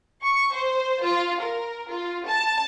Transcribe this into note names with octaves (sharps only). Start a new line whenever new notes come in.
C#6
C5
F4
A#4
F4
A5